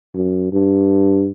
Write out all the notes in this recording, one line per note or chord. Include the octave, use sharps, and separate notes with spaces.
F#2
G2